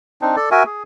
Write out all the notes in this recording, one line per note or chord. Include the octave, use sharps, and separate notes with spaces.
C4 D4 D#4
A4 D5
F#4 A#4 E5 G#5
G#4